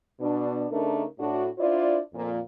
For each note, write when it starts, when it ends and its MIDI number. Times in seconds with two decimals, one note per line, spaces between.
0.20 0.66 47
0.20 0.66 62
0.71 1.04 49
0.71 1.04 57
0.71 1.04 62
0.71 1.04 63
0.71 1.04 70
1.19 1.46 45
1.19 1.46 62
1.19 1.46 66
1.59 2.00 62
1.59 2.00 64
1.59 2.00 65
1.59 2.00 72
1.59 2.00 74
2.13 2.38 41
2.13 2.38 46